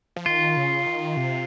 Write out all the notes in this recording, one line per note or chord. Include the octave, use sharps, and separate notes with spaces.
F3
D#3 F4
C#3
D#3
C3